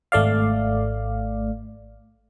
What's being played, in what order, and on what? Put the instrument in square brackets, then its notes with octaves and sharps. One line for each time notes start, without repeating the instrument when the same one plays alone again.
[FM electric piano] G#1 A3 D5 F5